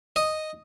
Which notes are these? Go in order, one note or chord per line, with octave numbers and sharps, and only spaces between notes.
D#5